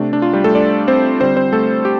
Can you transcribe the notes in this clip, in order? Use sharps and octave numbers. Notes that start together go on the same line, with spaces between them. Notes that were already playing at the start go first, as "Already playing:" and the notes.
Already playing: C3 A3 D4
D4
F4
G3 G4
A3 A4
D4 D5
C4 C5
D3 G3 C4 C5
C4 C5
A3 A4
G4